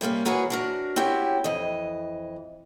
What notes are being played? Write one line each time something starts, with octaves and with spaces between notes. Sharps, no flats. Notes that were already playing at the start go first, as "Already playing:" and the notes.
C3 G3 A#3 C#4
E3 A#3 F#4 G#4 B4 C#5
D4 F#4 A#4
C4 C#4 E4 F#4 G4 C#5
F2 E3 D#5